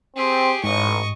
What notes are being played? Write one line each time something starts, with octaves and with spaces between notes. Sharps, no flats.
C4 G4 G#4
A1 G#2 D#5 C#6